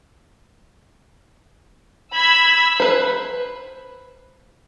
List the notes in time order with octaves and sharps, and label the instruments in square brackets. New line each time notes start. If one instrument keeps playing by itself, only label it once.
[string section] B5 E6 G#6
[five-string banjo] B4 C5